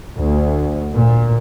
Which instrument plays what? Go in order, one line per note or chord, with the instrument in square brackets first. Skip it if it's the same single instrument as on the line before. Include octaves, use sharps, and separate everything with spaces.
[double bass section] D2
A#2